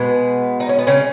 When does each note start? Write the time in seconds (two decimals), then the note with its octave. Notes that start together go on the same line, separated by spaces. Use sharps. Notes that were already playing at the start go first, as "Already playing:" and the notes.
Already playing: B2 G#3 B3
0.60 D#4
0.69 C#4
0.78 B3
0.87 C#3 C#4